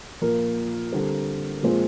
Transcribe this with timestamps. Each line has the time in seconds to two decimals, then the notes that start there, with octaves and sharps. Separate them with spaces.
0.21 A#2 F3 A#3 A#4
0.92 D3 G3 C4
1.63 A#2 F3 G#3 C4